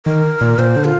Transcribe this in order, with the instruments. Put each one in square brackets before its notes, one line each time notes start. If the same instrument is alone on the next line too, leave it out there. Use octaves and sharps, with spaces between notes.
[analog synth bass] D#3 [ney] A#4
[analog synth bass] A#2
[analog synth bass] A#2 [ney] C5
[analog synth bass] D3
[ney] F4